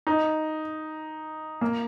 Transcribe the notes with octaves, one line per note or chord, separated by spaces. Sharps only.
D#4
A#3